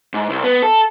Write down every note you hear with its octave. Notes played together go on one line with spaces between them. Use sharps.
G#2
C2
B3
A4